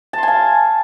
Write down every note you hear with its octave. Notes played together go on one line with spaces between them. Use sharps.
F5 G#5 A5 C6